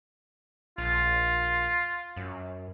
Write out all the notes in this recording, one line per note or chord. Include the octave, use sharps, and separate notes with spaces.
A#1 F4
F#2